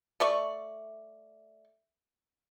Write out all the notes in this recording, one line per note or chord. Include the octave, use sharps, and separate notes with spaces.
A3 D5 C#6